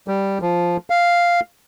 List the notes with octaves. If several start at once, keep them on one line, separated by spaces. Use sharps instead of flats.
G3
F3
F5